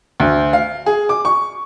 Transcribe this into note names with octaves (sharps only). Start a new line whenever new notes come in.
D2
F5
G#4
D6
C#6